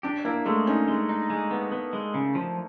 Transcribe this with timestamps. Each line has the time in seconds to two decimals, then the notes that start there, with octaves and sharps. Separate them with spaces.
0.03 D4 G4
0.25 A#3 E4
0.46 G#3 A3
0.67 C#4 D#4
0.88 G#3
1.09 D#4
1.30 G#3
1.51 B3
1.72 B3
1.93 G#3
2.14 C#3
2.35 F3